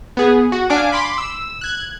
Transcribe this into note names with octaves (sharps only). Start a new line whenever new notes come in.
B3 G#4
F#4
D4 F5 G#5 D6 D7
B5 C6 D6
E6
F#6 G#6